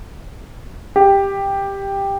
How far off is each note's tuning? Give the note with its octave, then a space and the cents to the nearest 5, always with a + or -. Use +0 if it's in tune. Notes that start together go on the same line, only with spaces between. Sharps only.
G4 +10